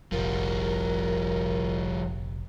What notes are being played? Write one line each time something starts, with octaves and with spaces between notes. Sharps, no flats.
F1 A#1 F3 G3 A#4